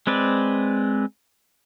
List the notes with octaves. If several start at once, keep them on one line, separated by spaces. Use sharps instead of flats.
G#3 C4 B4 D5